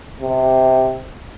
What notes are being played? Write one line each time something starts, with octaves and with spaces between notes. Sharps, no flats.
C3